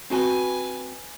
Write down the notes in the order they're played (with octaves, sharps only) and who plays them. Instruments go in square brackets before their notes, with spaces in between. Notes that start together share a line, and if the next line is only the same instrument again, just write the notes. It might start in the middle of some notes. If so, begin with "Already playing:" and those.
[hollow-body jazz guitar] C4 F#4 A5 [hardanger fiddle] B4 G#5